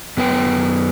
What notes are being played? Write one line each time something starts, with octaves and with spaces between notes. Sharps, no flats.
F#2 B3 B4 G5